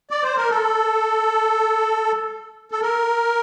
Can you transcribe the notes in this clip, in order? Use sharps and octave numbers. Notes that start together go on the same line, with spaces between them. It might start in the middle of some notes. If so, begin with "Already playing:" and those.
D5
C5
A#4
A4
A4
A#4